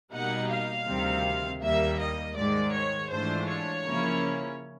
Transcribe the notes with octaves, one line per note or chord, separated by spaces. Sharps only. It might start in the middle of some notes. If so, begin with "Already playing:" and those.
B2 G3 A#3 D#4 F#5
F5
D2 C3 D#3 G3 C4
D#2 D#3 G3 A#3 E5
D#5
G#2 D#3 G#3 D5
C#5
G#2 E3 A3 D4 F4 C5
C#5
C#3 F3 A#3 C#4 E4